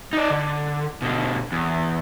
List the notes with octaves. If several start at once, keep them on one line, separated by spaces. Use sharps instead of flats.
D#4 D5
D3
B2 D3
E2